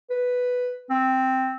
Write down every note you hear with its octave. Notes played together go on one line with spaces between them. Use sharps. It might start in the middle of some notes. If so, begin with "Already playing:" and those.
B4
C4